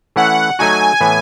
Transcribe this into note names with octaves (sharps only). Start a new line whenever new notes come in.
E3 A3 C#4 E4 F#5
F#3 A3 D#4 F#4 G#5
A2 E3 B3